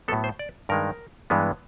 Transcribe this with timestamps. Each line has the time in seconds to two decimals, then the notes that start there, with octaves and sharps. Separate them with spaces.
0.08 A2 F#3 B3 A4
0.24 C5
0.39 D5
0.69 G2 D#3 G#3 A#4
1.30 G2 E3 G#3 B3